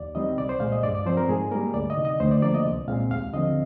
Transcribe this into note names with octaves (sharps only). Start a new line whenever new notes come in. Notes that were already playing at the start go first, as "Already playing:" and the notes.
Already playing: D#2 D5
D#3 G3 C4 D#5
C2 D5
C5
A#2 G#3 F5
D#5
G2 D5
D5
F3 C4 C5
A#4
G#2 G#4
G3 A#3 A#4
D2 D5
D#5
C3 D#3
D#5
D2 C5
D5
D3 F3 A#3 D5
D#5
C2
A#2 G#3 C4 F5
D#2 F5
D3 F3 C4 D#5